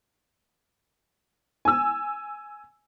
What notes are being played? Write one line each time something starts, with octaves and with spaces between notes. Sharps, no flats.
G#5 E6